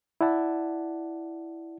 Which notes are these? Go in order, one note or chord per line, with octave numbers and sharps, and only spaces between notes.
E4 D5 F#5 A5